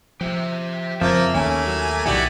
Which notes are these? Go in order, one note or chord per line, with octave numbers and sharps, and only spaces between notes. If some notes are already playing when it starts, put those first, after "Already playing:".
F3 G4 E5
F2 C#3 F3 A#3 E5
D#2 A3 A#3 C#4 E4 G#5
F#3
B1 B2 D#3 B3 E4 F#4 G4 D5